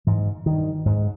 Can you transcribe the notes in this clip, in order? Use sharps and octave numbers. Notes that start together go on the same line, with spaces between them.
G#2 E3
G2 D#3
G#2